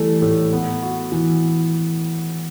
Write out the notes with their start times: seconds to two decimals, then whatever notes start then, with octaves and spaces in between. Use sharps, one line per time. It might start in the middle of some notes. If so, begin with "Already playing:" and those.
Already playing: E3 G3 A3
0.22 A2
0.53 B3
0.82 F#4
1.12 E3